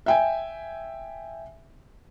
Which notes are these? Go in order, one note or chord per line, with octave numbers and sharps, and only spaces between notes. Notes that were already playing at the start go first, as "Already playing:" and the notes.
E5 G5 G#5